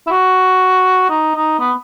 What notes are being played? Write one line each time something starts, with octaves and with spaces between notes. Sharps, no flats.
E4
F#4
D#4
D#4
B3